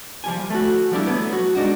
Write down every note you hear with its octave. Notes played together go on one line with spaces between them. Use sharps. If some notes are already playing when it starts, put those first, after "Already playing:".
F3 G3 G#5
A3 F#4
F3 G3 D4 E4
F#3 A3 B3
F#4
G#3 D4 D#4 F#4